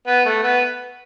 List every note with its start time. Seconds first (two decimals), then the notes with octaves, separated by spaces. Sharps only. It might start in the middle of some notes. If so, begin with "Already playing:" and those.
0.07 B3
0.26 A3
0.43 B3